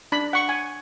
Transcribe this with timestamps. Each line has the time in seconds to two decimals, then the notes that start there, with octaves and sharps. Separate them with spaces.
0.12 D4 B5
0.33 F#5 C#6
0.49 G#5